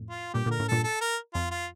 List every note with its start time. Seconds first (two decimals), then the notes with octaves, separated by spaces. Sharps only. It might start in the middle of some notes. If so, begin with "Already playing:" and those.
Already playing: F2 A2
0.10 F4
0.34 G2 A#2 G4
0.46 A#2 D3 A#4
0.60 A2 C#3
0.68 G2 A#2 A4
0.84 A4
1.01 A#4
1.34 F2 F4
1.51 F4